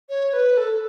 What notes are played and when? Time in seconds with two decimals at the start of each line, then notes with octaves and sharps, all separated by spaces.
0.09 C#5
0.33 B4
0.57 A4